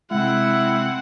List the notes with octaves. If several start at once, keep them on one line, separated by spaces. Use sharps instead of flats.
C3 G#3 C4 E4 F#5